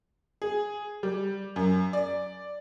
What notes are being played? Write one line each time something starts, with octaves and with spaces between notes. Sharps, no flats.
G#4
G3
F#2
D5